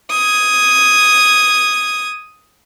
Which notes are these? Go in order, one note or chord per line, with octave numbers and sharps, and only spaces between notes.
D#6 G#6